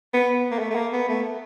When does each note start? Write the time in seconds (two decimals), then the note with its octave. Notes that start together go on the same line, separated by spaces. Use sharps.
0.14 B3
0.52 A#3
0.59 A3
0.70 A3
0.75 A#3
0.92 B3
1.08 A3